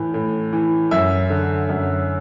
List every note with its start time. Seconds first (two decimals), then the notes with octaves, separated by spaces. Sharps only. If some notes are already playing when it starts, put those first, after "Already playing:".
Already playing: A2 E3
0.14 A2
0.53 E3
0.91 F#2 E5
1.30 D3
1.69 F#2